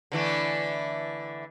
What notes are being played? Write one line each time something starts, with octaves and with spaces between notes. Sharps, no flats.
D3 E3 A3